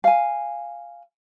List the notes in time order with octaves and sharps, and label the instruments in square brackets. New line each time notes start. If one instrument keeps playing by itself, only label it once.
[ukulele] F5 G#5